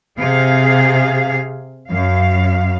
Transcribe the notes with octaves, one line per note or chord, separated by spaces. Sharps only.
C3 G#4 F5
F#2 F5